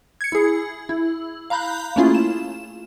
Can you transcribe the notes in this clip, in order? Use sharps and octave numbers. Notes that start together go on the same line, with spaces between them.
G#6 C#7
E4 G#4
E4
F5 A#5 B5 F#6 G6
A3 A#3 C#4 E4 F4 G#4
E7